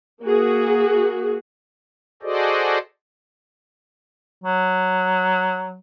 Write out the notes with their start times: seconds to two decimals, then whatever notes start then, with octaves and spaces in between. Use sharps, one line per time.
0.23 A#3 F#4 G#4
2.23 F#4 G#4 A4 C5 D5 D#5
4.44 F#3